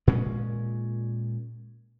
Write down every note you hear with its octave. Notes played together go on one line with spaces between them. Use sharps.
A#2 G#3 C#4